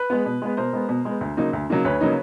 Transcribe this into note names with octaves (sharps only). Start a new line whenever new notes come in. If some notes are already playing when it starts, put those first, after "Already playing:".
Already playing: B4
G#3 B3
B2
G#3 B3
B2 A#4 C5
G#3 B3
B2
G#3 B3
D2
C#3 F#3 A#3 D#4
D2
C#3 F#3 A#3 D#4
D2 B4 C#5
C#3 F#3 A#3 D#4